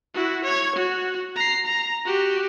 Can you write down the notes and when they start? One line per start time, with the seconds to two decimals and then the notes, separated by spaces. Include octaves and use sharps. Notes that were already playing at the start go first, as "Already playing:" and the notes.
0.14 E4 F#4
0.45 C#5 G#6
0.76 F#4
1.36 A#5 C7
1.66 A#5
2.05 F#4 G4